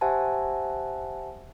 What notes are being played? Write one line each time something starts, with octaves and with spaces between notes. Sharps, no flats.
G4 C5 E5 F#5 G#5 A5